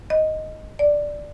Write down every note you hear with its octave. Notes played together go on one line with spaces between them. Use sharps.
D#5
D5